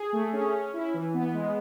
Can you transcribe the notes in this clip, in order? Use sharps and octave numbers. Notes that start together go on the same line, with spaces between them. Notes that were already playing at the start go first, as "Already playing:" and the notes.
Already playing: G#4
A3
C#4
C#4
E4
E3
B3
G#3